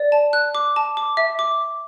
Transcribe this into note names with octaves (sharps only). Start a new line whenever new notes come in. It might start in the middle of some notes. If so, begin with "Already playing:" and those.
Already playing: D5
A5
F#6
D6
A5
D6
E5
D6